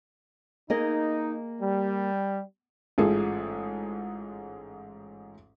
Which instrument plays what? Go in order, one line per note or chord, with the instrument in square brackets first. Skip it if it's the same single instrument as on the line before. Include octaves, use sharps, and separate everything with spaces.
[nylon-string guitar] A#3 G#4 D#5 [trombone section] D#4
[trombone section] G3
[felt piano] A1 G#2 F4 G#4 A4